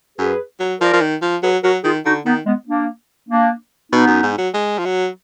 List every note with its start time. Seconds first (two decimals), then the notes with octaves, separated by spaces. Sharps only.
0.19 F#2 G#4 B4
0.60 F#3
0.81 F3 A#4 D5
0.93 F3
1.01 D#3
1.22 F3
1.42 F#3 G#4 B4
1.63 F#3 F#4 A#4
1.84 D#3 F4 G#4
2.05 D3 D#4 F#4
2.26 D#3 B3 D#4
2.46 G#3 B3
2.67 A#3 D4
3.29 A#3 D4
3.92 B2 B3 D#4
4.07 F#2
4.23 G#2
4.38 F#3
4.54 G#3
4.79 F3
4.86 F#3